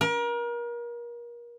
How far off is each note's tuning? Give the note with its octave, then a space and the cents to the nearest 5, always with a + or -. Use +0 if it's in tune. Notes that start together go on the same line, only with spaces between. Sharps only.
A#4 +35